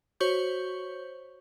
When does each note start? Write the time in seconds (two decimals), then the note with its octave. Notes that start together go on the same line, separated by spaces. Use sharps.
0.20 F#4 C5 C#5 C#6 G6